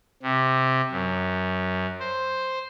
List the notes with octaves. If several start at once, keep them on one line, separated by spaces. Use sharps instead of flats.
C3
F#2
C5